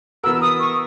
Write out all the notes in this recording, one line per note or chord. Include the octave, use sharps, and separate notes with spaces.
E3 B3 F#4 A#4 E6
D#6
C#6